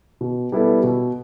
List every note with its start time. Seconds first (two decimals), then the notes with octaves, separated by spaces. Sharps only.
0.21 B2
0.52 G3 B3 E4 A4
0.83 B2